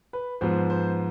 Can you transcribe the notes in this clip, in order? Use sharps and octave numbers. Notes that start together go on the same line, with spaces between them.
B4
G#2 F3 B3 C5
C5